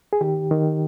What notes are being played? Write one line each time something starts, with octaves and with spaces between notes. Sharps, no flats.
G#4
D#3 G4
D#3